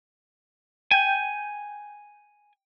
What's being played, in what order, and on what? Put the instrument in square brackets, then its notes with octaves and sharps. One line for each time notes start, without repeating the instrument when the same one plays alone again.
[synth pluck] G5 G6 [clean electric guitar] G#5